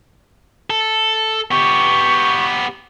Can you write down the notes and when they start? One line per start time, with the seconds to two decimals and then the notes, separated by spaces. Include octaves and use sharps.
0.70 A4
1.51 B3 G4 C#6